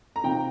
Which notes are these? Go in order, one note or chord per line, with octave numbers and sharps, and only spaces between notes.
A#5
C3 F3 D#4 G5